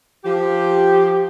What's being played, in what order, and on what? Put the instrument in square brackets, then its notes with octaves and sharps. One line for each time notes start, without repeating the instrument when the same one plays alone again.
[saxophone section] F3 G4